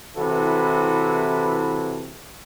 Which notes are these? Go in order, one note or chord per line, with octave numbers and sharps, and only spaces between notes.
C3 E3 E4 F#4 A4 B4